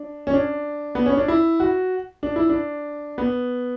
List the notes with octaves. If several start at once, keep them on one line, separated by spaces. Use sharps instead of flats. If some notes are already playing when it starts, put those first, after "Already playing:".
Already playing: D4
C#4
D4
B3
C#4
D4
E4
F#4
D4
E4
D4
B3